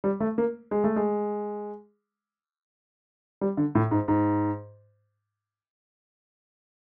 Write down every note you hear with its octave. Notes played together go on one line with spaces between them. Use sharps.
G3
A3
A#3
G#3
A3
G#3
G3
D3
A2
G#2
G#2